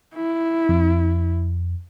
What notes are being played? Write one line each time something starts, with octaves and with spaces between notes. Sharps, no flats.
E4
F2